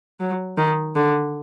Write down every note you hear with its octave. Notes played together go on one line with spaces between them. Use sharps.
F#3
D#3
D3